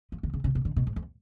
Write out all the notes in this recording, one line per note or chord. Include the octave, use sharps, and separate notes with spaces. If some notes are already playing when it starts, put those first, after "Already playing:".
F3
D3
C#3
C#3
B2
D3
B2
G#2
F2